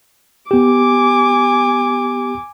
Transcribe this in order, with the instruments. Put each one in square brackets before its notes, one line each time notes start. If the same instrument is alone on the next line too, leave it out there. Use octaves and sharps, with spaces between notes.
[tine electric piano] B3 G4 [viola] G#5 D6